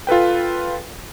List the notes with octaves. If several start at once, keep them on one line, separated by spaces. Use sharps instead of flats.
F4 A4 B4 G5